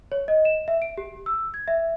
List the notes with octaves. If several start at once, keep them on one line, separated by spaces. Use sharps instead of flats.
C#5
D#5
E7
E5
D7
G4
E6
G#6
E5